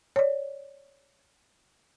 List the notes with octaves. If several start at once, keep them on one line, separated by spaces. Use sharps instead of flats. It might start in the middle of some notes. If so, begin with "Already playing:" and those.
C#5 D5